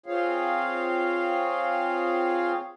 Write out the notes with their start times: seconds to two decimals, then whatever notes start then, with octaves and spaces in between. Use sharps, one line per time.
0.06 C4 F4 G#4 C#5 F5